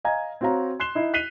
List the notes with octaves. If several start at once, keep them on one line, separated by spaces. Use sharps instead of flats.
D#5 F5 G#5 A#5 G#6
C4 F#4 C#5 F5 A#5
C6 F#6 C7 E7 G7
D#4 E4
F#6 B6 C7 D#7 F7 G7